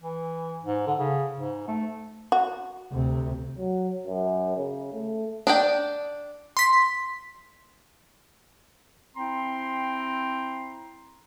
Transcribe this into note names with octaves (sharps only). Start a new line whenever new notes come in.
E3
G#2
D3
C#3
G#2
A3
F#4
D2 C3
F#3
F#2
C#3
A3
D4 D5 G5
C6 B6
C4 E4 G5 A#5 C6